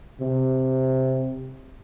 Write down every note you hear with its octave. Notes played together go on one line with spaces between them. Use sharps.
C3